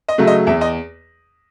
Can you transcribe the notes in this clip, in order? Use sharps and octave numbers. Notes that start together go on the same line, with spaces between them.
D#5
C#3 F#3 A3
D#5
E2 E5
D#5